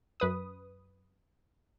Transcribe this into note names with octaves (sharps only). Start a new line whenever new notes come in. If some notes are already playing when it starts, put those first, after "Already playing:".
F#2 B4 D#6